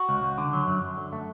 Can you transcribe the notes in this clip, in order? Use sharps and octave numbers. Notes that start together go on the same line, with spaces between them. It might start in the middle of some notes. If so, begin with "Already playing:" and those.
Already playing: F#4
C#2
C#2
D3
F#3
F#2
F#2
D3
A3